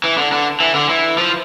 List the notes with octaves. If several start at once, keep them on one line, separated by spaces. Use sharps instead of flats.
E3
D3
D3
E3
D3
E3
F3